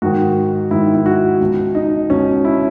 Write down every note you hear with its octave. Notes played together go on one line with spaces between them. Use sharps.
G#2 D#3 F#4
G#2 D#3 E4
E4
F#4
C#2 B2
D#4
C#2 B2 C#4
E4